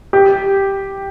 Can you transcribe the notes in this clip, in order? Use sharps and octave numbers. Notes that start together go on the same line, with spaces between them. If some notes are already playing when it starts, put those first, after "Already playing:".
G4